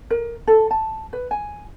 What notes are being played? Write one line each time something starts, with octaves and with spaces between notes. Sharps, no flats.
A#4
A4
A5
B4
G#5